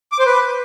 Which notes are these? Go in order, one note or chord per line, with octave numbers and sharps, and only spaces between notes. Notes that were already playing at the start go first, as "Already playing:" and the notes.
D6
C5
B4